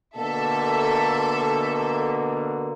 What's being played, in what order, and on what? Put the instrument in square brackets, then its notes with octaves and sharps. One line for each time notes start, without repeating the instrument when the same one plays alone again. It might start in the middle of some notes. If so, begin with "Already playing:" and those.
[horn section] B2 D3 A#3 [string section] A4 E5